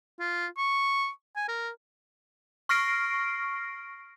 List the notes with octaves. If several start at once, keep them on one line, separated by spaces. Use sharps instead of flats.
F4
C#6
G#5
A#4
C#6 F6 A#6 C7 D7